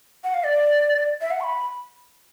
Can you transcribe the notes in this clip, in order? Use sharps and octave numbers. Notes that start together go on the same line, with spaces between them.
F#5
F5
D5
E5
F#5
C#6
B5